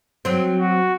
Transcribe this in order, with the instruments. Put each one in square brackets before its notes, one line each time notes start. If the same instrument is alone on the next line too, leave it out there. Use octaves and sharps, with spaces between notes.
[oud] F#3 C4
[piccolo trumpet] F#4